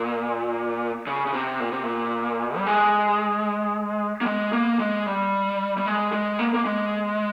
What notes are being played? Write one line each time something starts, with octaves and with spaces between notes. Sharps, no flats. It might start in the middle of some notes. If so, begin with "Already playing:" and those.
Already playing: A#2
C#3
C#3
C3
A#2
C3
A#2
G3
G#3
A#3
G#3
A#3
G#3
G3
G3
G#3
G#3
A#3
A#3
G#3